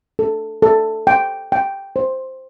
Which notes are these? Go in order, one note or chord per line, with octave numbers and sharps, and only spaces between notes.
A4
A4
G5
G5
C5